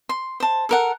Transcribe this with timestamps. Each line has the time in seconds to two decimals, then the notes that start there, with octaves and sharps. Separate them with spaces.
0.09 C6
0.40 C5 A5
0.69 A4 A#4 F#5